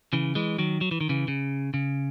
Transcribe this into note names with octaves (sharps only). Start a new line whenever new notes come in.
C#3 E3
E3 G#3
D#3 F#3
F#3
E3
D#3
C#3 E3
C#3
C#3